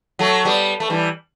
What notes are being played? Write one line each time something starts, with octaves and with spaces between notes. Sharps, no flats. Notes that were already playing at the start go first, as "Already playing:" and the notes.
F#3 A3
G3 B3
A3
E3 G3